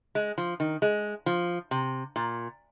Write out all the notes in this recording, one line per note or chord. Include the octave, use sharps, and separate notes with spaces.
G#3
F3
D#3
G#3
F3
C3
A#2